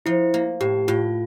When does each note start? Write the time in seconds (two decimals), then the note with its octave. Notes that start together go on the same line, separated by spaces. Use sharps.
0.06 F3 E4
0.34 A#3
0.61 A2 G4
0.88 A2 F4